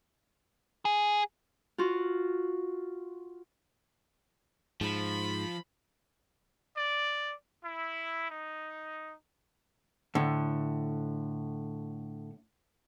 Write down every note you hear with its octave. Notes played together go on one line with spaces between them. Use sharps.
G#4
F4 F#4
G#2 F3 B5
D5
E4
D#4
A2 D3